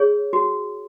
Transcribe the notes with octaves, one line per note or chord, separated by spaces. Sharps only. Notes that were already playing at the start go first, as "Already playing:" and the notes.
Already playing: G#4 C#5
F#4